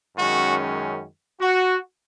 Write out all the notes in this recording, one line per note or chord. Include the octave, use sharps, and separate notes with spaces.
F#2 D#3 G#3 C#4 F#4
F#4